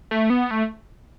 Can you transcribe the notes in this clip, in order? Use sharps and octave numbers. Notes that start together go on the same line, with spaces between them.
A3
B3
A3